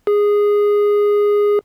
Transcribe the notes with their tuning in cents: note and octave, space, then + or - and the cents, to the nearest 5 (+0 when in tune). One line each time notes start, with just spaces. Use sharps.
G#4 -10